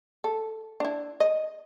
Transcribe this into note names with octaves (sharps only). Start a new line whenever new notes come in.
A4
D4 E4
D#5